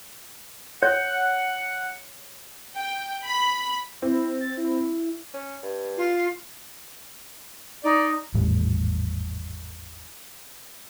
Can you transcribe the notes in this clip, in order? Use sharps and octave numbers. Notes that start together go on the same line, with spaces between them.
C#5 F#5
G5
B5
C4 E4
A6
E4
C#4
G2
F4
D#4 D5
G#1 E2 A2 G3